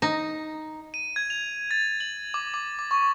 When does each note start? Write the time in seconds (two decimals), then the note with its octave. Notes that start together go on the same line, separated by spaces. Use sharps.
0.02 D#4
0.94 D#7
1.16 G#6
1.30 F7
1.71 A6
2.00 F#7
2.34 D6
2.54 D6
2.79 D6
2.91 C#6